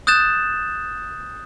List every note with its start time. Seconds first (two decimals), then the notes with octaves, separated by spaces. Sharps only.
0.07 D#6 F#6 G6 A6 E7